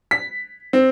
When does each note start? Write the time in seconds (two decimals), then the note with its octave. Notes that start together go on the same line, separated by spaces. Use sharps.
0.11 B6
0.73 C4